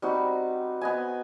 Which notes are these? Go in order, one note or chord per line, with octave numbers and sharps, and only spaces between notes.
G3 C4 D#4 F#4
B3 D#5 G#5